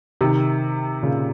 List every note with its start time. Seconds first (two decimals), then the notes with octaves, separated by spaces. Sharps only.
0.21 C3 D#3
1.03 A#2 C#3